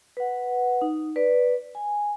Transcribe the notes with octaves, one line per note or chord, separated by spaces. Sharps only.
B4 F#5
D#4
B4 D5
G#5